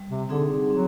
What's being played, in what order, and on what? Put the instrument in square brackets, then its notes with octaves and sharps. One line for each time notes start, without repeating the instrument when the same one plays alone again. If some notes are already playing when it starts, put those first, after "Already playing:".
Already playing: [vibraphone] G3
[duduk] C3
[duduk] D3 [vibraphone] C4 D#4 G#4
[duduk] F#3 [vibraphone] C4